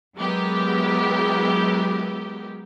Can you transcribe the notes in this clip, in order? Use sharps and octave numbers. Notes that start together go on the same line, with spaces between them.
F#3 G#3 B3 E4 G4 A#4